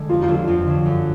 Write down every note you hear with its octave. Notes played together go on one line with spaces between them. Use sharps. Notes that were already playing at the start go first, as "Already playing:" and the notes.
Already playing: D3 G#3
F2 F4
F4
D3 F#3 D4
F4
F2
D3 F#3 D4
F#2